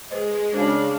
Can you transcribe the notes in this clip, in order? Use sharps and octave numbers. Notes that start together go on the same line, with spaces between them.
G#3 G#4 B4 C5 D#5
C#3 D4 F#4 A#4 C5 F5